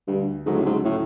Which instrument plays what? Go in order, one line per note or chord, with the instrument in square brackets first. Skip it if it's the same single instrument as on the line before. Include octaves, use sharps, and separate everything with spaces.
[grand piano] D2 [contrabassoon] G2
[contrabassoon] G#2 [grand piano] C#3 F#3 A3
[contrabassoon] A2
G#2
A2